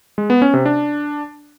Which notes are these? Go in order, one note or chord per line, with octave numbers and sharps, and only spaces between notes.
G#3
B3
C#4
C3
D4